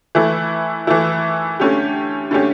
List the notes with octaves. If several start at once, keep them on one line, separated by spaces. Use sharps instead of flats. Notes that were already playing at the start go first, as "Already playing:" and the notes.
E3 A3 E4
E3 A3 E4
D3 A3 C#4 G4
D3 A3 C#4 G4